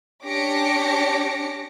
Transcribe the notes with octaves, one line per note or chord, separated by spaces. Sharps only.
C#4 D4 G4 D6 A#6 C#7